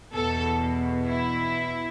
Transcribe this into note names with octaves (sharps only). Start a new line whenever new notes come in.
E2 B2 A4
E4